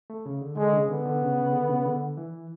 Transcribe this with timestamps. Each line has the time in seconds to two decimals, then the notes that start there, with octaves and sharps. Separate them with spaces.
0.10 A3
0.26 C#3
0.41 D3
0.57 D3 G#3
0.73 C#3
0.89 D3 B3
1.06 D3
1.21 C#3
1.37 C#3
1.53 D3
1.70 C#3
1.86 D3
2.17 E3